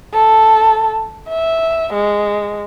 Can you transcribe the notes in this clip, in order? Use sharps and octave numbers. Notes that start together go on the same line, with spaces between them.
A4
E5
G#3